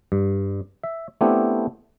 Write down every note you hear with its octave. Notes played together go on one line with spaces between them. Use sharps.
G2
E5
A3 B3 C4 D4 E4 G4